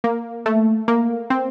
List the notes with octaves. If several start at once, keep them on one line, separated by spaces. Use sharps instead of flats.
A#3
A3
A#3
C4